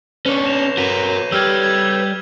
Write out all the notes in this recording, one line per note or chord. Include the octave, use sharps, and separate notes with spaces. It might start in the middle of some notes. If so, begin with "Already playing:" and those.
C#4 D4 B4 C#5
A#6 E7 F7
F#4 A#4 B6 D#7 F7
G3 G4 E6 F6 G#6
G#6